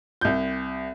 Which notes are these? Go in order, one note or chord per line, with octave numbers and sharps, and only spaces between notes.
C2 G6